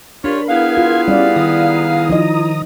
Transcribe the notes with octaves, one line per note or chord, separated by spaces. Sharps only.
D4 F4 G4 A#4 C#5 B5
B3 E4 G#4 A#4 F5 G#6
F4
G3 C#4 D5
D#3 A#5 D#6
F3 D#4 D#5